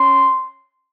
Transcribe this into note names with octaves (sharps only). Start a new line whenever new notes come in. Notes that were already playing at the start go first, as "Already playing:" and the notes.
Already playing: C#4 C6